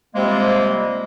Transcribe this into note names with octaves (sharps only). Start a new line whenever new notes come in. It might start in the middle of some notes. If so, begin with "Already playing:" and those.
C3 F3 G3 G#3 A#3 C4